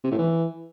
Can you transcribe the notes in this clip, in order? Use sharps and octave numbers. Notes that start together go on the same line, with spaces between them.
C3
A2
E3